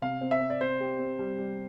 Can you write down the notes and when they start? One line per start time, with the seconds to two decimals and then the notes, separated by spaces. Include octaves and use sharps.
0.02 C3 F5
0.21 C4
0.31 E5
0.41 C4
0.50 D5
0.61 C4 C5
0.80 G4
0.98 C4
1.19 G3
1.38 G3